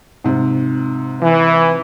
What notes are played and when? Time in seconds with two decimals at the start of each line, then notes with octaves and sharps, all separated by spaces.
0.24 G#2 C3
1.22 E3